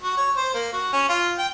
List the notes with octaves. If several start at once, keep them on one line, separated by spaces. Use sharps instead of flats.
F#4
C#5
C5
A#3
F#4
C#4
F4
G5